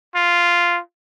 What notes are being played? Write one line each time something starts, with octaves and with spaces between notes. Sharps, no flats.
F4